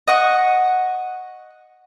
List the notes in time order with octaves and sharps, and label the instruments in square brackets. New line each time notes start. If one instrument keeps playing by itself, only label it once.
[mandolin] D#5 F#5 C#6